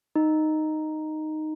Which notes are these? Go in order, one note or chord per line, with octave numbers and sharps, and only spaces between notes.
D#4